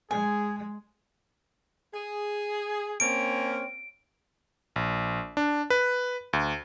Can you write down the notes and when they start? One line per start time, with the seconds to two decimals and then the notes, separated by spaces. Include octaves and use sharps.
0.11 G#3 G#4 G#5
1.93 G#4
3.00 A#3 C4 C#4 D7
4.76 A#1
5.37 D4
5.70 B4
6.33 D2